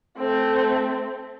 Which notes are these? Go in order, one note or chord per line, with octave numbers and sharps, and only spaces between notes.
A3 C4